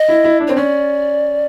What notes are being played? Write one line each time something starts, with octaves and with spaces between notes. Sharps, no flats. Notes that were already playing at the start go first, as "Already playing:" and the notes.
Already playing: D#5
E4
E4
D4
C4 C#5
C#4 D5